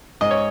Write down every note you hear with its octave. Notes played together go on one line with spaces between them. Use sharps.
G#2 D#5
C#5